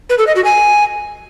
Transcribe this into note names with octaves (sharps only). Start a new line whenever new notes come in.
B4
A4
D#5
F#4
G#5